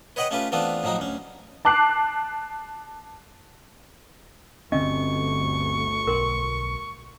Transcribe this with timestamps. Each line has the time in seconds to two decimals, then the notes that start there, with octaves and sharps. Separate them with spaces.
0.16 B4 C#5 D#5 F#5 G5 B5
0.31 A3 C#4 F4 G4 B4
0.52 E3 A3 B3 C4 D4 F4
0.83 A2 F3 F#3 D#4 F#4
0.99 D2 C#4
1.65 A5 D6 F#6 C7
4.72 G1 D2 D3 A3 C4 C#4 D#5 C#6
6.07 B1 A#4 C6